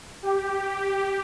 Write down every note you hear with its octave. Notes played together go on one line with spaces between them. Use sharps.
G4